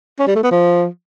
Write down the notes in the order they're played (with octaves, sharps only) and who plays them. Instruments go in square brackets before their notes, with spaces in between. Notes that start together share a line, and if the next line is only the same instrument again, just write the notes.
[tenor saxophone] C#4
G3
A3
B3
F3